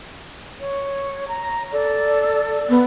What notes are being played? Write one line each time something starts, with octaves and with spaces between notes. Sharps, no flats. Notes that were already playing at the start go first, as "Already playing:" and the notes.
C#5
A#5
A4 D5
B3